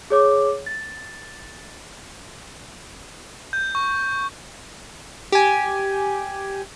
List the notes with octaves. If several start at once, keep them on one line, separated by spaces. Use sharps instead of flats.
G#4 C#5 D6
A6
G6
C#6
G4 G#5